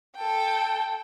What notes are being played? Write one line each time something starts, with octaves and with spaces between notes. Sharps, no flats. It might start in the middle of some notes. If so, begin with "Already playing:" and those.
A4 G5